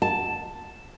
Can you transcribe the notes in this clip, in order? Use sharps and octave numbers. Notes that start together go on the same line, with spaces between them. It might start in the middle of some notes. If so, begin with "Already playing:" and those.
A5